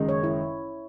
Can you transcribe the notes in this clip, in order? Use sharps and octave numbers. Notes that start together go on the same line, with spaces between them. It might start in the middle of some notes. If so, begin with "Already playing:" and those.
Already playing: F#1 F#2 D#3 G#3 D#4
C#5
E4